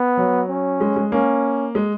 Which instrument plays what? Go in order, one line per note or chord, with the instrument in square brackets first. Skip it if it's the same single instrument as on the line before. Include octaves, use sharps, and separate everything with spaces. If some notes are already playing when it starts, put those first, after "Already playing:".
Already playing: [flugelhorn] B3
[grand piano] F#3
[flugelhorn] C#4
[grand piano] G#3
G#3
[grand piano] A#3 [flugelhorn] C#4
[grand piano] G#3